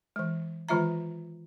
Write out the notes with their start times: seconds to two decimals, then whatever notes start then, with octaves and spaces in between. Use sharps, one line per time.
0.16 E3 G#3
0.69 D#3 E3 G#3 F4 E5 A#5